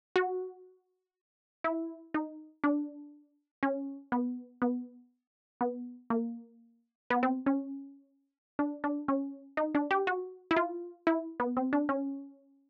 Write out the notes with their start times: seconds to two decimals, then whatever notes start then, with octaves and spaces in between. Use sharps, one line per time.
0.16 F#4
1.64 E4
2.14 D#4
2.64 D4
3.63 C#4
4.12 B3
4.62 B3
5.61 B3
6.10 A#3
7.10 B3
7.23 C4
7.46 C#4
8.59 D4
8.84 D4
9.08 C#4
9.57 D#4
9.75 D4
9.91 G4
10.07 F#4
10.51 E4
10.57 F4
11.07 E4
11.40 B3
11.57 C4
11.73 D4
11.89 C#4